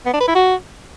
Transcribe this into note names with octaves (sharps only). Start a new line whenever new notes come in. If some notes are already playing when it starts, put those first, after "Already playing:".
B3
D4
B4
E4
F#4